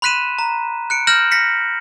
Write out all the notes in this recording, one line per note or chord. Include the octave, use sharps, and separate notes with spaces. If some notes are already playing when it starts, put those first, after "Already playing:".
B5 C6 F#6 B6 D#7 E7
A#5
F#6 C#7 D7
F6 G6 A#6 E7 F#7
A#6 B6 C#7